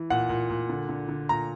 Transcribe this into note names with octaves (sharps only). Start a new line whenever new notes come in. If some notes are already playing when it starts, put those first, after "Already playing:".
Already playing: E3
A#2 F#5
A#2
A#2
D3
D3
D3
A#2 A#5